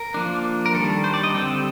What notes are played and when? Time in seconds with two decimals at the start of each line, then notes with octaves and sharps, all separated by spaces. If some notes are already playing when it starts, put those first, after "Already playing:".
Already playing: A#4
0.14 F3 A#3 D4
0.66 A#4
0.74 D#3 G3 D4 A4
1.04 C5
1.14 D5
1.24 D#5
1.34 D3 G3 C4 G5